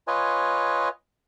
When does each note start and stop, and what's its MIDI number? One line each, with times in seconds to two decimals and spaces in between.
0.08 0.89 65
0.08 0.89 71
0.08 0.89 73
0.08 0.89 75
0.08 0.89 80